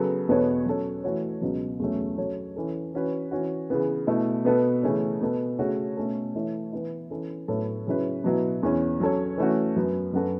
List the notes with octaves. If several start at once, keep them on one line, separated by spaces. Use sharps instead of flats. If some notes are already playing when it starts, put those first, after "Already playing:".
Already playing: C#3 F#3 B3 A4
E2 B2 B3 A4 C#5
F#3 C#4 A4 C#5
E3 A3 F#4 C#5
C#2 B2 F#3
E2 C#3 F#3 A3 C#4
F#3 C#4 A4 C#5
E3 C#4 A4
E3 C#4 F#4 B4
E3 C#4 F#4
C#3 E3 B3
B2 A3 E4
B2 B3 A4
C#3 E3 A3 C#4
B2 B3 A4
C#3 A3 C#4 F#4 C#5
B2 A3 C#4 A4
E3 A3 E4 C#5
E3 B3 E4
E3 C#4 A4
A2 F#3 B3 A4 C#5
C#3 F#3 C#4 E4 B4
B2 F#3 B3 E4
E2 E3 C#4
F#3 C#4 A4 C#5
E3 A3 C#4 F#4
F#2 F#3 B3
F#2 F#3 B3 F#4 A4